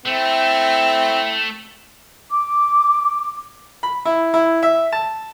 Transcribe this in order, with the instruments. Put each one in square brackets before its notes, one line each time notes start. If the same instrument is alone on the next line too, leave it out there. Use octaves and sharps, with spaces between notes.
[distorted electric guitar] A3 [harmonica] C4 E4
[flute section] D6
[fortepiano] B5
E4
E4
E5
A5